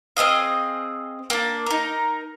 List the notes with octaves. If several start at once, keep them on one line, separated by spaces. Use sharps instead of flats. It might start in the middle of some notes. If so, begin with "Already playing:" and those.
C4 G#4 D#5 F5
A#3 D4
D#4 A#4